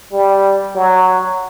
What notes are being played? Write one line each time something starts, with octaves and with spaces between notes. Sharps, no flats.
G3
F#3